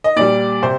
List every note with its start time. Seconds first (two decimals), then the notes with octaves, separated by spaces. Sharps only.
0.04 D#5
0.16 A#2 G3 D5
0.63 C3 C5